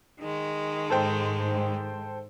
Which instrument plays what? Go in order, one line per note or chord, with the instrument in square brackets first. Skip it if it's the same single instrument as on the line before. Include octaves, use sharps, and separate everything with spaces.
[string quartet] D#3 G#3
[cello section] G#2 [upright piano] A4 C5 G5